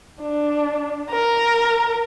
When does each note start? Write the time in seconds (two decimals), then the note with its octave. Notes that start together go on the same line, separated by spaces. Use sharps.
0.22 D4
1.11 A#4